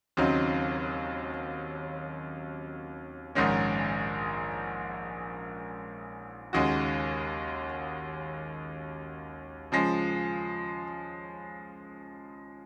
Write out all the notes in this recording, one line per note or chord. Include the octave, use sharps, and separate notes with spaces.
D#2 C#3 F#3 C4 D#4
A#1 G#2 D#3 G#3 C#4
D#2 C#3 G#3 D#4 F#4
C#3 F3 G#3